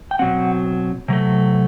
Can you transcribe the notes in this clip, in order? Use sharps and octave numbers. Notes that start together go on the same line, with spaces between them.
G5
B2 F#3 C4 F#5
C3 F#3 A3